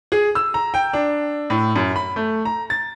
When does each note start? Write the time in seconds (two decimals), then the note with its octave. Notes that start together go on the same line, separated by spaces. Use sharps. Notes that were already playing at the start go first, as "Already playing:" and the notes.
0.12 G#4
0.35 E6
0.54 A#5
0.74 G5
0.93 D4
1.50 A2
1.76 F#2
1.96 B5
2.16 A3
2.45 A#5
2.70 A6